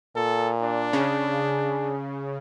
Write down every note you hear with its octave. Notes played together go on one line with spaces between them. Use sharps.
A#2 A4
D4
C#3
G#4